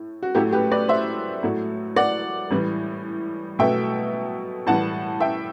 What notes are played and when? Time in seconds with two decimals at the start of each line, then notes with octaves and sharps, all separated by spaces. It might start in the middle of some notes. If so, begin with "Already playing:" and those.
Already playing: A2
0.22 F#4
0.35 A2 F#3 A3 E4 G4
0.52 G4 B4
0.72 B4 D5
0.88 C5 E5
1.43 A2 F#3 A3
1.96 D5 F#5
2.50 A2 E3 G3
3.59 B2 F#3 A3 E5 G5
4.66 A2 E3 G3 F#5 A5
5.20 E5 G5